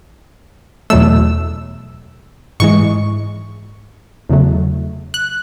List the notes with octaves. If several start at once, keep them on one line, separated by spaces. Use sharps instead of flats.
E2 B2 F#3 A3 E6
G#2 E3 G#3 C#6
E2 C#3 F#3 A3
F#6